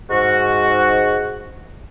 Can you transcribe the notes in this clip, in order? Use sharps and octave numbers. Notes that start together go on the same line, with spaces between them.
G#2 F#4